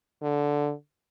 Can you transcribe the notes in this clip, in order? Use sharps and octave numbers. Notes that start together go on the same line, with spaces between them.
D3